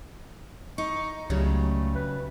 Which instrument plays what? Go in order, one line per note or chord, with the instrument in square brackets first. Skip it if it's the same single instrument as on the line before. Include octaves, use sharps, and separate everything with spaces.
[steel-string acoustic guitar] D#4 [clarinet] C#6
[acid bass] C#2 [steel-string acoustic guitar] C#3 F#3 G3 [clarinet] A3
[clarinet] B4